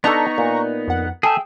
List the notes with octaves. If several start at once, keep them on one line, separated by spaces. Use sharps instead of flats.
B3 D4 D#4 A4 A#5 C#6
A#2
F2 F#5
G#4 A4 E5 G5 G#5